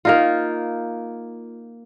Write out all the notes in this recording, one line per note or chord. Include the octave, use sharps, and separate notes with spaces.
A#3 D#4 F4